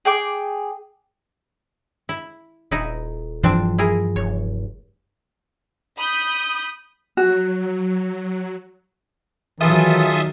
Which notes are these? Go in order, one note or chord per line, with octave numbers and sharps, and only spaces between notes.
G#4 G5 D6
E4
D#1 D#4 E4
G2 E3 F3 C4 D4 C5
E4 G#4 A#4
F1 C#5
B5 D#6 G6
F#3 F#4
D#3 E3 F#3 F4 G#4 A4 E5 D#6